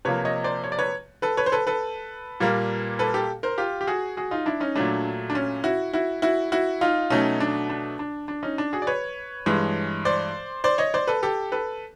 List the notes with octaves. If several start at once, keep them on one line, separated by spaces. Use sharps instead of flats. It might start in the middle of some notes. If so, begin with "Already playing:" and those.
C3 F3 A#3 B4 C#5
C#5 D#5
C5 D5
C#5
D5
B4 C#5
A4 B4
B4 C#5
C5
A4 B4
A4 B4
A#2 G3 A#3
A4 B4
G4 A4
A#4 C5
F4 G4
G4
F#4 G#4
F#4 G#4
D#4 F4
D4 E4
C#4 D#4
A#2 F#3 A3 D4
D4
C#4
E4 F#4
E4 F#4
E4 F#4
E4 F#4
D#4 F4
B2 F#3 A3 C#4 D#4
D4
D4
D4
D4
C#4 D#4
D4
F#4 G#4
D5
B4 C#5
G2 E3 G#3
C5 D5
C5 D5
C#5 D#5
C5 D5
A4 B4
G4 A4
A4 B4